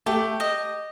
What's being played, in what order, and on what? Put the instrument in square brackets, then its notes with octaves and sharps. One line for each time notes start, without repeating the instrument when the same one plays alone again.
[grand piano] A3 [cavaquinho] G4
[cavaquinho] D#5